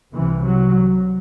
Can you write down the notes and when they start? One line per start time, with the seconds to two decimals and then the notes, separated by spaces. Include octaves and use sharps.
0.14 C2 C3 E3
0.44 F#3